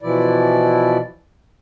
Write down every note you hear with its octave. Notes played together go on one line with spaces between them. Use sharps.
B2 E3 F3 E4 D5